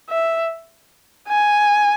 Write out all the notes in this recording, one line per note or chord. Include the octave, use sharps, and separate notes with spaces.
E5
G#5